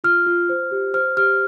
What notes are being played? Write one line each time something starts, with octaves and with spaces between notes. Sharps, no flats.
F4 F6
F4
C5
G4
C5 F6
G4 F6